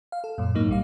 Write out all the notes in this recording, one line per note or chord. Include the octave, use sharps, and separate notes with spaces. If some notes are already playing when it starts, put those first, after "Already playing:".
F5
A4
F#2 A#2
G#2 F#3 A#3 D#4
A#1 G3 F5